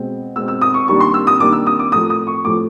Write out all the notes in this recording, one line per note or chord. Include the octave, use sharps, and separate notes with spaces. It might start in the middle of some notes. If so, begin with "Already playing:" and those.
Already playing: B2 G#3 C4
B2 G#3 C4 E6
E6
D#6
C#6
D#3 G3 A#3 D4 C#6
C6
E6
D#6
D#3 G3 A#3 D4 D6
E6
D#6
D6
A2 F3 A3 D#6
D#6
C#6
A2 F3 A3 D6